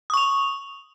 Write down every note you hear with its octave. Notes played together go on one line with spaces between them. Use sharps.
C#6 D#6 F7